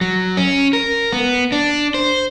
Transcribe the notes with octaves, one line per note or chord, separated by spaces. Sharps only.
F#3
C#4
A#4
B3
D4
C5